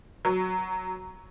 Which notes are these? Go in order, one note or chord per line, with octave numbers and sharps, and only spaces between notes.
F#3